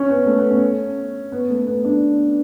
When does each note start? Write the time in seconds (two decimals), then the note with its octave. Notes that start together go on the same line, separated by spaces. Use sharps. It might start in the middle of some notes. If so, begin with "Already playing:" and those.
Already playing: C#4
0.09 B3
0.26 A3
0.39 B3
0.50 C#4
1.32 B3
1.50 A3
1.67 B3
1.85 D4